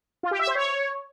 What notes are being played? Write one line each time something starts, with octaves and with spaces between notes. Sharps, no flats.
F4
G4
E5
C5
C#5